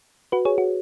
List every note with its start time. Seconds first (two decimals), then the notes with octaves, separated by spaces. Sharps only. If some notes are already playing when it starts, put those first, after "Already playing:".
0.32 F#4 B4
0.45 G#4 C#5
0.58 F#4